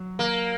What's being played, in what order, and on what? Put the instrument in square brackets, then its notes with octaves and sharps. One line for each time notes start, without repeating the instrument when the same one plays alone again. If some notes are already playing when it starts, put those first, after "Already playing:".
Already playing: [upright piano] F#3
[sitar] A#3